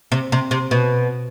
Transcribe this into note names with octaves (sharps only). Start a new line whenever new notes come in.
C3
C3
C3
B2